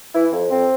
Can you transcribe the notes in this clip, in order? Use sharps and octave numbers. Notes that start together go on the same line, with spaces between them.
E3 E4
F2
F2 C4